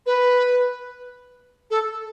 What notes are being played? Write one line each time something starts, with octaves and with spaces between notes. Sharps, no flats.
B4
A4